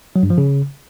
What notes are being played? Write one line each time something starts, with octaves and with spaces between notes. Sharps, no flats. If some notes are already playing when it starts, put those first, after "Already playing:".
F#3
G2
F3
C#3